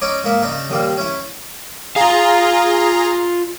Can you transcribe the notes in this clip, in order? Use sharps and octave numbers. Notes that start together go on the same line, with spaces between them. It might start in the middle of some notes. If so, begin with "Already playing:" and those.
C#4 D#4 C#5 D5
G#2 A#3 E5
C#3 D4 D#4
D#2 A#2 G3 A#3
C#4 E4
F4 G#4 F5 A#5